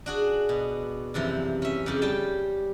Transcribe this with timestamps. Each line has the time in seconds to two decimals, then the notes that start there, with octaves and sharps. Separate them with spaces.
0.06 D4 F#4 G#4
0.49 B2
1.14 F#2 C3 E3 F3
1.62 C#4 E5
1.86 F2 C#3 G4
2.02 G3 G5 A5